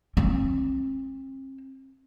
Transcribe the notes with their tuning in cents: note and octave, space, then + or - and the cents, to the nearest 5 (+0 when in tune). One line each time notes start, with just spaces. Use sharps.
C4 +40